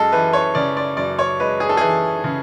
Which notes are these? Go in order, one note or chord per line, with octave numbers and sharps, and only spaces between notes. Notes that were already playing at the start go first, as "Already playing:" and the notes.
Already playing: F#2 G#3 A4
E3 B4
C#5
C#3 D5
D5
F#2 D5
C#5
G#3 B4
G#4
A4
E3 G#4
C#3